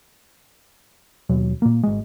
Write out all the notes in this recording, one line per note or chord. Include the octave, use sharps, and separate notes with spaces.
D#2 B2 F#3
A#2 A#3
G#1 G#3